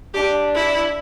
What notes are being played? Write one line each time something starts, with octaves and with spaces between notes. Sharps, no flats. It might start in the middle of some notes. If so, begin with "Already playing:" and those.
D4 G4
E4